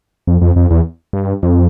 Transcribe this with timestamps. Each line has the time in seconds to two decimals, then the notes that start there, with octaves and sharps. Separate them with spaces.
0.27 F2
0.41 F2
0.56 F2
0.71 E2
1.13 G2
1.43 F2